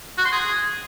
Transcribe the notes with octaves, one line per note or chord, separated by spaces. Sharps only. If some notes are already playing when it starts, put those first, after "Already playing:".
F#4
C6
G#4